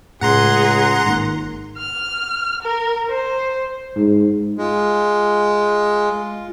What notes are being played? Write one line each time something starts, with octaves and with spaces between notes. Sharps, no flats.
C#2 A2 G#4 F#5 A#5 C6
G#1 D#3 A#3
F6
A#4
C5
G#2
G#3 F4